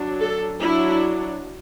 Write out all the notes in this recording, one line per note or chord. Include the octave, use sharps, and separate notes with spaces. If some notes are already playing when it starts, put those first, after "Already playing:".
Already playing: F#3 D4
A4
F#3 D4 E4